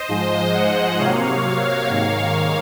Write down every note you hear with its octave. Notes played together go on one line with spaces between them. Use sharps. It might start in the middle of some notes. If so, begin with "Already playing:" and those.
Already playing: C5 D#5
G#2 F3 G#3
D#5 F#5
C3 F#3 A#3 C#5 F5
G#2 D#3 A#3 C#5 F5